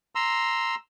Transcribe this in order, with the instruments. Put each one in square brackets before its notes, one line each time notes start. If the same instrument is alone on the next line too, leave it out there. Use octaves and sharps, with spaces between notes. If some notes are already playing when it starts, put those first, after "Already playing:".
[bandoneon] A#5 C6 E6